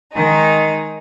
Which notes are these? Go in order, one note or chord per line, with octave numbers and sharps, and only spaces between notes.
D#3 G#3 D#4